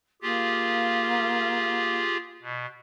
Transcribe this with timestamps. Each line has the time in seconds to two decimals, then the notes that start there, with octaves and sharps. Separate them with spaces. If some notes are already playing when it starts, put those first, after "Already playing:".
0.22 A#3 F4 G4 G#4
2.42 B2